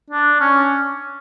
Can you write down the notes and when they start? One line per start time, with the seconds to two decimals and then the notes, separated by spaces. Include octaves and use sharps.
0.10 D4
0.40 C#4